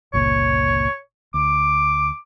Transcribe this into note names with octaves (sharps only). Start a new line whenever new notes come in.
G1 C#2 A#2 C#5
D2 D6